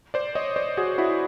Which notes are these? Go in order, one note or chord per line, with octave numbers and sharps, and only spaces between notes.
C5 D5
C#5 D#5
C5 D5
F#4 G#4
E4 F#4